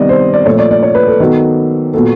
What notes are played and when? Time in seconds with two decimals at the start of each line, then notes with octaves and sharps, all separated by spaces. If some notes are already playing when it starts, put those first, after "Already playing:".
Already playing: C3 D#3 G3 B3 D5 D#5
0.09 C5
0.34 D5
0.45 A#2 F3 A3 C#5
0.59 D5
0.71 D5
0.83 C#5
0.95 B4
1.08 A4
1.20 D#3 F#3 B3
1.94 A#2 F#3 B3 A4